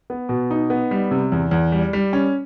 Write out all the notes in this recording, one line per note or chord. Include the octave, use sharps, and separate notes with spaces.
B3
B2
D#4
B3
G3
C3
E2
E2
G3
G3
C#4